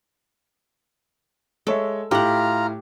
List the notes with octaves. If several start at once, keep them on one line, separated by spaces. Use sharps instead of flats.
G#3 A4 C#5 E5
A2 E4 F4 G4 F#5 A#5 F6